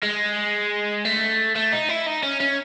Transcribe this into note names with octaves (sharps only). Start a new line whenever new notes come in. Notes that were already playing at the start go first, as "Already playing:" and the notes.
G#3
A3
A3
D#4
E4
D#4
C#4
C#4